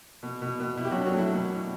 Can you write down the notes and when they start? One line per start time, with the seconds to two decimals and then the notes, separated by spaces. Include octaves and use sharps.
0.23 B2
0.42 B2
0.60 B2
0.77 B2 E4
0.85 G4
0.91 F#3 D4 F#4
1.06 F#3 F#4
1.14 A3 E4
1.32 B2
1.51 B2